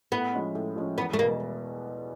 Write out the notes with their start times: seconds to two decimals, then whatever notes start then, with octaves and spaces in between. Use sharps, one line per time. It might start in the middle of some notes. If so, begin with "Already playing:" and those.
0.12 A2 B3
0.33 F3 G#3 C#4
0.55 A2
0.76 F3 G#3 C#4
0.97 E2 B3
1.13 A3
1.19 G#3 A#3
1.22 B2